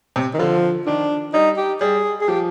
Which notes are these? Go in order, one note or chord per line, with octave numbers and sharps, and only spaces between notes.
C3
D#3
D3 F3
D#3 D4
G3 D#4
G4
G3 G#4
G#4
F3 G4